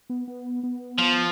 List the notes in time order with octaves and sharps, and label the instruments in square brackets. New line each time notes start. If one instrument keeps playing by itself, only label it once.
[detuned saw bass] B3
B3
B3
[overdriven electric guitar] F3